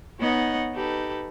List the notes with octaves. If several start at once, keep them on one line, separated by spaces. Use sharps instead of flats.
B3 D#4 C#5 D#5 F#5
D#4 G4 A4 B4